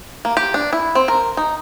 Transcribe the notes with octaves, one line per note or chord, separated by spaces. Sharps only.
A#3
G4
D4
E4
C4
A#4
D#4